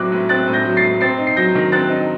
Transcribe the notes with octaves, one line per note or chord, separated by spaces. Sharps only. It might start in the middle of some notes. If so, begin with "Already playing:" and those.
Already playing: A2 F#3 C4 D6 F#6
A2
C4 F#6 A6
A2
G6 A#6
F#3
A6 C7
A2
C4 A6 C7
D#4
C7
F#3 G6 A#6
D#3
C4 F#6 A6
D#4